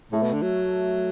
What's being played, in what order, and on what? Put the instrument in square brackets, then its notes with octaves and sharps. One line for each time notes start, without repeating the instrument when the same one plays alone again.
[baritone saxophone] A2 [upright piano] A3
[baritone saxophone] B2
D3
F#3